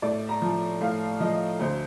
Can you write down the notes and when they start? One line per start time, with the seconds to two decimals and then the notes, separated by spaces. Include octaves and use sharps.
0.02 A2 D5
0.29 A#5
0.42 F3
0.81 A2 F5
1.20 F3 D#5
1.60 D2 C5